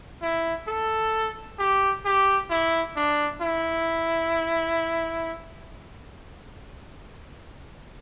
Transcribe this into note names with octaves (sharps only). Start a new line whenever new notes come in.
E4
A4
G4
G4
E4
D4
E4